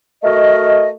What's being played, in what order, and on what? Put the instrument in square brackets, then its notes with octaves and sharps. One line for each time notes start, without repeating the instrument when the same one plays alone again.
[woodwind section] A3 F#4 A#4 D#5